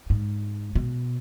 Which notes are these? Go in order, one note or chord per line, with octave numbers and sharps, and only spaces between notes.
G#2
B2